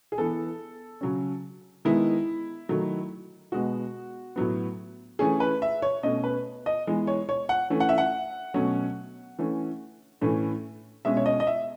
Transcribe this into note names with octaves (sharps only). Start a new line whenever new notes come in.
G#4
E3 B3 A4
C#3 F#3 C#4
D#3 G#3 B3 E4
D#3 F#3 A3
B2 G#3 B3 F#4
A2 F#3 B3
E3 A3 C#4 G#4
B4
E5
C#5
B2 A3 C#4 D#5
B4
D#5
E3 G#3 B3
C#5
C#5
F#5
E3 A3 C#4
F#5
E5
F#5
B2 F#3 A3 C#4
E3 A3 C#4
A2 E3 A3 C#4
B2 G#3 C#4 E5
C#5
D#5
D#5
E5